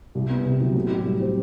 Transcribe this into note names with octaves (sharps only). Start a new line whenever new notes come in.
C2
B3
C3
F#3
A2
G4
G3
C4